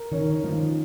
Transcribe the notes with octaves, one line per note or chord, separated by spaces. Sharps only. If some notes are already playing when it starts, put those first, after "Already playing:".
Already playing: A#4
D#3 C#4
D#3 F3